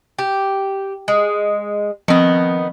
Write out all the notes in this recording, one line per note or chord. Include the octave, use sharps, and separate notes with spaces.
G4
G#3
D#3 F3 B3 C4